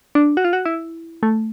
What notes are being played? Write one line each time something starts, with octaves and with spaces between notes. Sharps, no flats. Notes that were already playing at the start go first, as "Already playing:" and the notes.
D4
F#4
F4
F#4
E4
A3